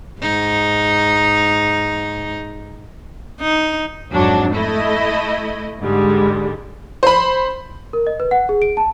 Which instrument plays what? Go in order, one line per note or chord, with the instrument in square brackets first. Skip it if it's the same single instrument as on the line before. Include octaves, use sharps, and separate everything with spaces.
[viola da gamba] G#2 D#4
D#4
[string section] F2 G#2 F#3 D4
A3 E4 D#5
G#2 D3 G3 G#3
[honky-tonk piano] C5 B5
[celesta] A#4
D#5
B4
F#5
G#4
D7
A5